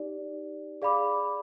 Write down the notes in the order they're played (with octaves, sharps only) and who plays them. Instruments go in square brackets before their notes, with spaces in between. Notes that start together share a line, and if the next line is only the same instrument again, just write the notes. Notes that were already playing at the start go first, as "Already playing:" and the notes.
Already playing: [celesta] D#4 G4 D5
G#4 D5 F5 B5 D6